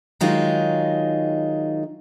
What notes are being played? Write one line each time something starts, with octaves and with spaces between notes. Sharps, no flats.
D#3 F#3 G#3 D#4 F4